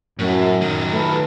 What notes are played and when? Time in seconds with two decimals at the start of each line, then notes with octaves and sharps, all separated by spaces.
0.19 F#2 A2
0.61 D#3 F#3
0.93 A3 A4 B4